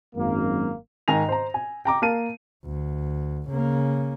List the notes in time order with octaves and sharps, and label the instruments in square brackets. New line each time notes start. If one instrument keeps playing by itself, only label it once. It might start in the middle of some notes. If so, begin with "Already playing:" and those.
[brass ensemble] G#1 F#2 A#3
[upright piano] G#2 D#3 G#5 A#6 F7
C5 A#5
G#5
G5 A#5 D6
A#3 A#4 F5 A5 D#7
[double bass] D2
C#3 A#3